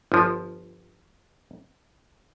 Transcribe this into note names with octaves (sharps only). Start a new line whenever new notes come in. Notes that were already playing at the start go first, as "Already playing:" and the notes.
G1 F3